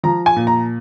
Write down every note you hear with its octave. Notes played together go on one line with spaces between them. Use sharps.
F3 A#5
G#5
A#2
A#5